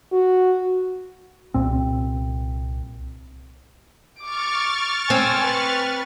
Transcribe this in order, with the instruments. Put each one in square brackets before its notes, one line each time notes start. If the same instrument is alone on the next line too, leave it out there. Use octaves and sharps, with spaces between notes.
[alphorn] F#4
[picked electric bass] C2 A#2 C4
[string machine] C#6 F6 A6 [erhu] D6
[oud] C4 [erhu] G#5
[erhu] B4